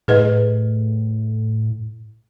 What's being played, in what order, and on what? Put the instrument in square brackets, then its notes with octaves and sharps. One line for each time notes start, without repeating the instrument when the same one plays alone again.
[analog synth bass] A2 [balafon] G#4 B4 D#5